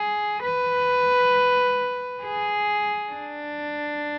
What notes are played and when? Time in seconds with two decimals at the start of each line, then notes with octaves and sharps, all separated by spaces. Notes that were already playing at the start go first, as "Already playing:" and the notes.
Already playing: G#4
0.42 B4
2.23 G#4
3.12 D4